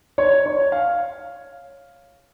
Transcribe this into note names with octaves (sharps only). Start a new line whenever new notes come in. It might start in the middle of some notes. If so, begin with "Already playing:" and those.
C#5
C#5
F5